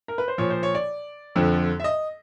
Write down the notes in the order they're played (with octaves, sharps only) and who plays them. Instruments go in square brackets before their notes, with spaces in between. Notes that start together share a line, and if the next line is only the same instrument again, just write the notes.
[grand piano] A#4
B4
C5
A#2 F3 C#5
C5
C#5
D5
F2 D3 F3
E5
D#5